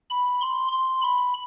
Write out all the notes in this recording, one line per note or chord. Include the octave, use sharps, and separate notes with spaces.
B5
C6
C6
B5